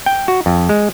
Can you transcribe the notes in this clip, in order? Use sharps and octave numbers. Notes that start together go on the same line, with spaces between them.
G5
F#4
F2
G#3